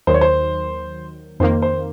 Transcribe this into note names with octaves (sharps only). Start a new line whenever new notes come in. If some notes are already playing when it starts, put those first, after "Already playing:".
D#2 D#3 F#3 C5
C#5
C5
F2 D#3 A#3 C5
C5